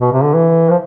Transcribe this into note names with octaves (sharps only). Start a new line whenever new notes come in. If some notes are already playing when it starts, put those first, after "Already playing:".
B2
C3
D3
E3
F3